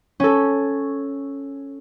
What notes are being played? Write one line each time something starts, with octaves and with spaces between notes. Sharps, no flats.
C#4 A4